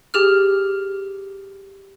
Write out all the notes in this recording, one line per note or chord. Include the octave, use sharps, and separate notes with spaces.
G4 G#4 F6